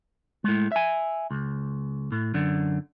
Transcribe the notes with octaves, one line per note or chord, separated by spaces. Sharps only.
A2 G#3
E5 G#5
C#2
A2
F#2 D3